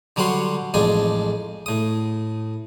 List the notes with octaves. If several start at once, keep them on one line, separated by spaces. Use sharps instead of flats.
D3 F#3 G3 C#5 F#5 C6
A1 F2 G#3 D4 G#5
A2 D#6